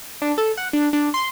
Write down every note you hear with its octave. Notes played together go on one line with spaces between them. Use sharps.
D4
A4
F#5
D4
D4
C6